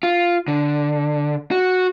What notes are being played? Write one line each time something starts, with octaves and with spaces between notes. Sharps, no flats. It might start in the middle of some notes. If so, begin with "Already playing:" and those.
F4
D3
F#4